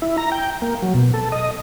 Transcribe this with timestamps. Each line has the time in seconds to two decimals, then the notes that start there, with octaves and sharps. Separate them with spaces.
0.02 E4
0.17 A#5
0.32 G5
0.62 A#3
0.82 F#3
0.94 B2
1.14 A4
1.32 D#5